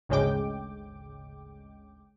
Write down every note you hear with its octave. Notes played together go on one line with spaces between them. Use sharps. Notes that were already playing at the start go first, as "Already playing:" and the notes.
G#1 D2 C#3 G#3 G5 D6